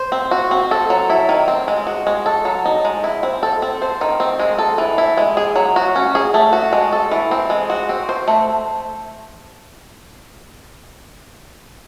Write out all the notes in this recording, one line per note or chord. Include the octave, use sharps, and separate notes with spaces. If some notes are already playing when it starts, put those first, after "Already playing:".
Already playing: C5
C4
F#4
C4
A4
F#3
E4
D#3
C4
G#3
F#4
G#3
A4
F#3
D#4
G#3
E4
C4
A4
C4
C5
D#3
C4
G#3
A4
E3
E4
G#3
G#4
F#3
F#4
C#4
G#4
A3
F#4
G#3
A4
E3
C4
G#3
F#4
C4
C5
A3